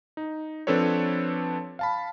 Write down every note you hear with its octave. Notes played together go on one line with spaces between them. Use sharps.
D#4
F3 C4 D4 A4 B4 C#5
F5 A5 B5